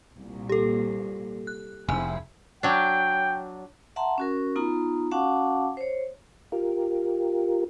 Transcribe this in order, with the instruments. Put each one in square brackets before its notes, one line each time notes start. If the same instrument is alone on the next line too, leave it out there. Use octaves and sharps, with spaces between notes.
[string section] C2 A#2
[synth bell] G4 A4
F#6
[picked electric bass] F1 [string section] C4 E4 G#4 [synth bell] G#5
[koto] F#3 D4 [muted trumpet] G5
[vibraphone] E5 F#5 A5 A#5 C6
C#4 F#4 A#4
B3 D#4 F4 A#5
C#4 F#4 F5 F#5 A5 D6
C5 C#5
[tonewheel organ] F4 G4 A#4